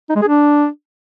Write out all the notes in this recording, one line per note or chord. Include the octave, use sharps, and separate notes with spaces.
D#4
G#3
G#4
D4